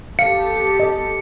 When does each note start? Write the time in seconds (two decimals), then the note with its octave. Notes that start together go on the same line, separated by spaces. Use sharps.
0.19 B3 G4 A4 F5 C#7
0.80 D#5